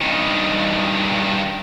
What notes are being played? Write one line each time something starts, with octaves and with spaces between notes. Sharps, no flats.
G2 D#3